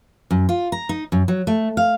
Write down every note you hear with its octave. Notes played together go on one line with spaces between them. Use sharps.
F#2
F4
A#5
D#4
F#2
F#3
A3
F5